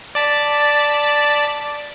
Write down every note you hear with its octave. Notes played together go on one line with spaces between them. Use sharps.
D5 A5 B6